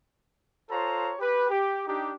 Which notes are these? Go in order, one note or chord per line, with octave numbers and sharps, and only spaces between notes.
F4 A4 C5 C#5 A#5
G4 B4
G4
D4 D#4 G4